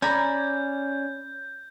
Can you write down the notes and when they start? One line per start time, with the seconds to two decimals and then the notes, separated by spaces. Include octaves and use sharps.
0.02 C#4 D5 G#5 A#5 B5 G6